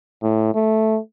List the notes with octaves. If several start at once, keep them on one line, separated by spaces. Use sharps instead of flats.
A2
A3